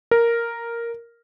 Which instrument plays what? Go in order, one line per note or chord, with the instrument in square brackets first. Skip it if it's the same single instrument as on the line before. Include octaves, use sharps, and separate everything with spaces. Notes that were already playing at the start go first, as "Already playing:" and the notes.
[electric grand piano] A#4